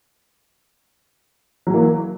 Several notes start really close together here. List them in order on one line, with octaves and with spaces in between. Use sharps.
F#3 E3 A#3